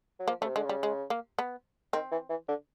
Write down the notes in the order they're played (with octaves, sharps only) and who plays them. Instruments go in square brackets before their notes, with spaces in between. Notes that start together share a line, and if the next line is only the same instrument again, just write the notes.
[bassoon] F#3
[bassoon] F3 [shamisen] A#3
[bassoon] C#3 [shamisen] A3
[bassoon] C3
[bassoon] D3 [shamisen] G#3
[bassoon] C#3 [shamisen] G3
[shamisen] G#3
A#3
B3
[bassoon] D#3 [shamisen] C4
[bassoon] E3
E3
D3